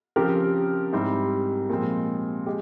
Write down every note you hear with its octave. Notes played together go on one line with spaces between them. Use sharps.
C#3 F3 C4 G4 A#4
G#2 G3 C4 E4
A#2 F3 G#3 C4
G#3 G4